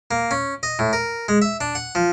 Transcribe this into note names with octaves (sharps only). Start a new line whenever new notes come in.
A#3
C#4
D#5
A2
A#4
G#3
E5
D4
F#5
F3